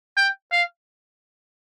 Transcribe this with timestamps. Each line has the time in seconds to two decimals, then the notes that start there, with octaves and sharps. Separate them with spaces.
0.17 G5
0.52 F5